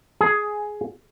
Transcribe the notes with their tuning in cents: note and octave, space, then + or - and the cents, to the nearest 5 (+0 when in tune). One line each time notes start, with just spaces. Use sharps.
G#4 +10